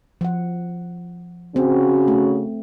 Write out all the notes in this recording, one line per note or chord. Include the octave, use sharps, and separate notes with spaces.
F3 F#5
C#3 C4 C#4 F#4
A3